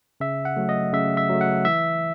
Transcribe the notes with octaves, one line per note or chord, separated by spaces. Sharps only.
C#3 E5
F#5
F#3 A3
D#5
C#3 E5
E5
F#3 A3
F#5
E3 E5